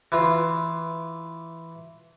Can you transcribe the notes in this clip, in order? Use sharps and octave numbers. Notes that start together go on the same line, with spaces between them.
E3 F4